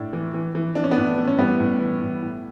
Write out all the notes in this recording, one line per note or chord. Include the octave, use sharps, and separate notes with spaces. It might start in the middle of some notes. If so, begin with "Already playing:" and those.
Already playing: A2 D4
E3
E3
E3
E3 D4
C#4
B3 D4
A2
E3
C#4
A2 G3 B3
A2
E3
A2
A2